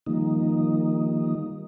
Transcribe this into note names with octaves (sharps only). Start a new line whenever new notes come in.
D#3 F3 G3 A#3 D#4